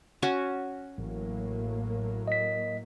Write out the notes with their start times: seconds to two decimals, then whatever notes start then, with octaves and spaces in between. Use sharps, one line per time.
0.22 C#4 F#4 G#5
0.98 A1 A2 F#3 A#3
2.28 D#5 B6